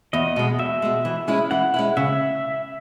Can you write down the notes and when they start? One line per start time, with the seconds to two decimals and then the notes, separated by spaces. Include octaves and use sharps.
0.13 E2 D#5
0.36 B2 G#3
0.59 E2 E5
0.82 B2 G#3
1.05 E3
1.28 G#3 C#4 E4
1.51 E3 F#5
1.74 G#3 C#4 E4
1.97 C#3 E5